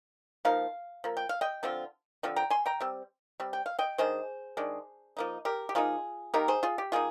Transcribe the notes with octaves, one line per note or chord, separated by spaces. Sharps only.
F3 A#3 D#4 F5
F3 A#3
G5
F5
D#5 G5
D3 F3 C4 F4
D3 F3 C4
G5 A#5
G#5 C6
G5 A#5
G3 C4
G3 C4
G5
F5
D#5 G5
D#3 G#3 D4 G#4 C5
D#3 G#3 D4
F3 A#3 D#4
G4 A#4
G4
F3 A#3 D#4 F4 G#4
D#3 A#3 D#4 G4 A#4
G#4 C5
F4 G#4
G4
D#3 A#3 D#4 F4 G#4